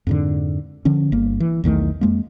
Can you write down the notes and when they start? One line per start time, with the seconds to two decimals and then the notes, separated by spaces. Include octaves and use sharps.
0.07 F2 G#2 D3
0.85 D3 F3 C#4
1.12 G1 A#3
1.40 E3
1.64 B1 E2 D#3 A3
2.01 F2 G#3 A#3